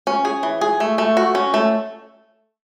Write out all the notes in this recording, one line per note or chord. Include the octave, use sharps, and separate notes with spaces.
C#4
G#4
E3
G#4
A3
A3
F#4
C#4
A3